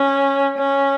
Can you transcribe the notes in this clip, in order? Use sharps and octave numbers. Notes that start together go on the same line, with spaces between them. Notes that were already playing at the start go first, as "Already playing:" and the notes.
Already playing: C#4
C#4